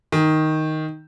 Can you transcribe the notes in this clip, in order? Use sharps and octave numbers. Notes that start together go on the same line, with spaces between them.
D#3